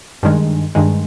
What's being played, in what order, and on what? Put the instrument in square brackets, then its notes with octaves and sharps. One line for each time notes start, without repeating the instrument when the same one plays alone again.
[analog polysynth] G2 D#3 G#3
G2 D#3 G#3